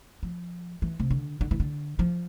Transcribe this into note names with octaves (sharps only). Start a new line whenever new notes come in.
F3
E3
C3
D3
D3
E3
D3
F3